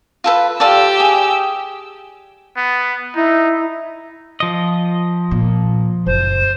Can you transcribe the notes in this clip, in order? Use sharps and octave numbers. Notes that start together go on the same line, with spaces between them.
F4 A4 B4
F4 G4 A4 D5 E6
G#4
B3
D#4 E4
F3 D#5
A#2
F#1 C5